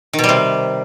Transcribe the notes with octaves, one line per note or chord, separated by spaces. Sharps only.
D#3
B2
G3
C3